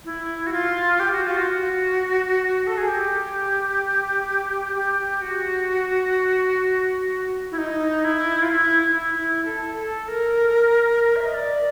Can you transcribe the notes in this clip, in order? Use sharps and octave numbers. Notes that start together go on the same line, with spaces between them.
E4
F#4
F4
G4
F#4
F4
F#4
A4
G#4
G4
G4
F#4
E4
D#4
E4
F4
E4
E4
E4
A4
A4
A#4
E5
D#5
D5